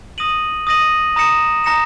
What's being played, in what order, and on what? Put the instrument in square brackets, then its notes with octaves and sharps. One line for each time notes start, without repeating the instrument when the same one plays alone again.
[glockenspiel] D#6 A#6 D#7 F#7
D#6 A#6 D#7 F#7
A#5 D#6 A#6 C#7 E7
A#5 D#6 A#6 C#7 E7